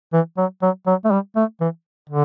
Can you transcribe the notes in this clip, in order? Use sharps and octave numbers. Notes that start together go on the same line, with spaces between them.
E3
F#3
F#3
F#3
A3
G3
A3
E3
D3